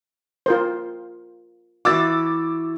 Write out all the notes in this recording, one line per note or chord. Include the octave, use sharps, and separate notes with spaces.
F4 A#4 C5
E3 E4 F#4 D6 E6 A6